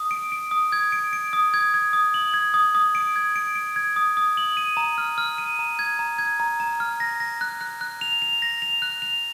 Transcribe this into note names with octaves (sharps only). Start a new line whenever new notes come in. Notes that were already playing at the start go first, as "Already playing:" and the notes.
Already playing: D#6
D7
D7
D#6
G#6
D7
D7
D#6
G#6
G#6
D#6
F#7
G#6
D#6
D#6
D7
G#6
D7
D7
G#6
D#6
D#6
F#7
D#7
A#5
F6
F6
D#7
A#5
G#6
A#5
G#6
A#5
A#5
F6
A#6
A#6
F#6
F#6
F#6
F7
F7
A#6
F7
F#6
F7